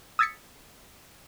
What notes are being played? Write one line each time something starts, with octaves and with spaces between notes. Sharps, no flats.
D#6 E6 G#6 A6 B6 C#7